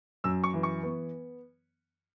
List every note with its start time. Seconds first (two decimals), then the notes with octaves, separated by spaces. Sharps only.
0.24 F#2 E6
0.44 C#6
0.54 E3
0.63 C#6
0.83 B3